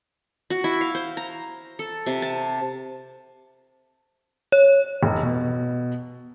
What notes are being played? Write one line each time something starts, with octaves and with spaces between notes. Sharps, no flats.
F#4
E4
F5
C5
A#5
A4
C3
A5
C#5
F1
B2